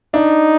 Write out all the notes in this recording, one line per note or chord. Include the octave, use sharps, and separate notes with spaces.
D4 D#4